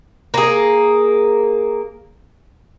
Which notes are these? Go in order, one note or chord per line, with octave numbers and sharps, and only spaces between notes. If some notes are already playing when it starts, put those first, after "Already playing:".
A#3 G#4